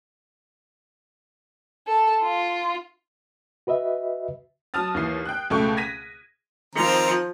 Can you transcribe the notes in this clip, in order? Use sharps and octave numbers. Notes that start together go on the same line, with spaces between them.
A4
F4
F#4 B4 D#5 E5
F#3 A5 D#6 F6 A6
D#2 E3 C7
G5 F#6
C#2 B2 A3 G5 C#6
G#6 A#6 B6 D#7
D#3 F3 C4 A#5